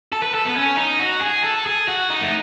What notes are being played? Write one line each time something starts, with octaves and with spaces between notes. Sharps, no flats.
A4
B4
A4
B3
C#4
D#4
F#4
G#4
A4
G#4
F#4
D#4
A3